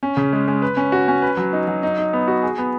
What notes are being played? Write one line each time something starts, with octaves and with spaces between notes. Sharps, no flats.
C#4
C#3
G#3
G#3
B4
C#4
F#4
C#4
B4
F#3
D#4
F#3
D#4
D#4
B3
F#4
G#4
B3